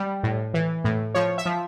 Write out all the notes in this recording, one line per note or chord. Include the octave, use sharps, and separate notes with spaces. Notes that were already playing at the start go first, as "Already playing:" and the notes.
Already playing: G3
A2
E3
A2
F3 C#5
E5
F3